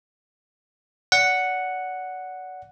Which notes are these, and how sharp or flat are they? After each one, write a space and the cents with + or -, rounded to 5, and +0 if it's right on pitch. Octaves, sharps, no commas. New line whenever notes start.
D5 -35 F#5 +0